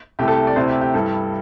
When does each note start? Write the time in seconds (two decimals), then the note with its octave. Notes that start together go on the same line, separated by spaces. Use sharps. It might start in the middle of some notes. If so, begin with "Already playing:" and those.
0.19 C2 C3 A3 E4 G4
0.28 A4
0.47 D5
0.56 D2 C3 A3 E4 C5
0.69 G4
0.81 G4
0.94 G2 G3 E4 A4